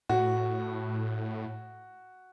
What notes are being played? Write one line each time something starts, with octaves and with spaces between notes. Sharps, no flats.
A2 F#4